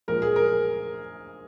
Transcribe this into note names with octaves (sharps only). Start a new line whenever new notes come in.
A#2 F3 G#3 A#4
G#4
A#4